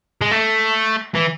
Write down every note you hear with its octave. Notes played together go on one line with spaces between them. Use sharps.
G#3
A3
E3